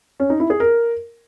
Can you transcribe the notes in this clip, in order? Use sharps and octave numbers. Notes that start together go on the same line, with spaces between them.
C#4
D#4
E4
G#4
A#4